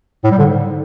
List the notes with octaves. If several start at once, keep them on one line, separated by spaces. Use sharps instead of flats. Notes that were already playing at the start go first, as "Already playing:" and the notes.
A2
G3
D3
G#2